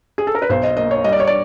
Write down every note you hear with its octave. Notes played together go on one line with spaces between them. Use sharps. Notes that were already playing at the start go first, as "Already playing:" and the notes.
G#4
A4
A#4
B4
B1 C5
D#5
A#3 D#5
C#5
G3 D#5
D5
C#5
D5